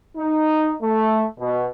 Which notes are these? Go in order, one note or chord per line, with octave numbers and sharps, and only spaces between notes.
D#4
A3
B2